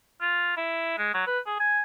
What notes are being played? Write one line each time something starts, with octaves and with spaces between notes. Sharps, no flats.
F4
E4
G#3
F#3
B4
G#4
G#5